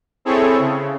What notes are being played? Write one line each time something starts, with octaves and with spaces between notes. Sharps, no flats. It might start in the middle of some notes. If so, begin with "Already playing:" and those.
C4 E4 G#4 A4 C#5
C#3